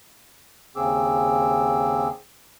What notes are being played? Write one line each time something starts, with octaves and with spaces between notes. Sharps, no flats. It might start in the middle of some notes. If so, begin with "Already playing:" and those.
D#2 C#3 C4 G#4 D6 E6